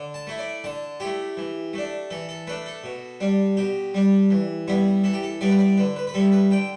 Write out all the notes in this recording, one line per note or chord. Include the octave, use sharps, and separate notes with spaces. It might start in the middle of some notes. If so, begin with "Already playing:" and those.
Already playing: D3
A5
A3 E4
D5
D3 A5
A3 E4 G4
E3
A3 D4
E3 A4
A4
A3 D4 B4
A4
B2
G3 D4
B2 G4
G3 D4
E3
G3 B3 E4
E3 A4
G4
A4
G3 B3 E4 D5
B4
D5
D3 B4
B4
B4
G3 E4 A4
B4
D3 G5